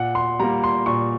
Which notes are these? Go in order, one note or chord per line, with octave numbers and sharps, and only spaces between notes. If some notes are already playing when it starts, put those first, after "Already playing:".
Already playing: A#2 F#5
C6
G3 A#3 A#5
C6
A#2 C#6